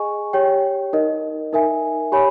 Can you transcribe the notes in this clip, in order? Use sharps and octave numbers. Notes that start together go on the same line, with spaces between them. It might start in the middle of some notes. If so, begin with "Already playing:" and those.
Already playing: G#4 D#5 G#5 C#6
G4 C#5 G5
D#4 A#4 D#5
D#4 A#4 E5 G#5
G4 C#5 G#5 B5